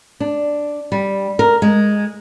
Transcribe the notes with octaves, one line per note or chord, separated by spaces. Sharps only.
D4
G3
A#4
G#3